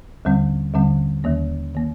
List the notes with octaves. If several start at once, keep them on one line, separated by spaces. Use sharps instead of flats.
D#2 D3 G3 C4
D#2 D3 G3 C4
D#2 D#3 A#3
D#3 A#3